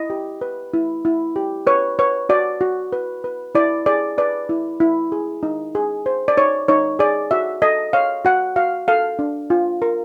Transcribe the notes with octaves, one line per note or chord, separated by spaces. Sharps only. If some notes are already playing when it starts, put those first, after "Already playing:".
Already playing: E4 D#5
G4
B4
E4
E4
G4
B4 C#5
B4 C#5
F#4 D5
F#4
B4
B4
E4 D5
G#4 D5
B4 D5
E4
E4
G#4
D#4
G#4
C5
D5
D#4 C#5
D#4 C#5
G#4 D5
F#4 E5
A4 D#5
C#5 F5
F#4 F#5
F#4 F5
A4 F5
D4
F4
A#4